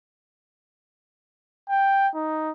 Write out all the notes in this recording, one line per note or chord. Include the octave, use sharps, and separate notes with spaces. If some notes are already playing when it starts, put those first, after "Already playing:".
G5
D#4